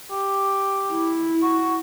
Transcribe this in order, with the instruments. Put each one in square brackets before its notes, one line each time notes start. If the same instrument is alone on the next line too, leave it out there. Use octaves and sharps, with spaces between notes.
[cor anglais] G4
[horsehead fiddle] E4
[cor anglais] F#4